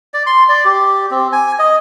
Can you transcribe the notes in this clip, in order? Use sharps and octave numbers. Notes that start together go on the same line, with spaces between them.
D5
C6
D5
G4
C4
G#5
D#5